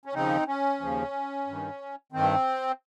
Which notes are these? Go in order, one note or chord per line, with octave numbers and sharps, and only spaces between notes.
C#4
D#2 C#3 F3 C4 D#4
C#4
D#2 C#3 F3
G2 D#3
G2 D#3 C4